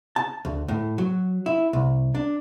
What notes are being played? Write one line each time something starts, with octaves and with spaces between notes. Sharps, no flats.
A5
D2
A2
F#3
E4
C2
D4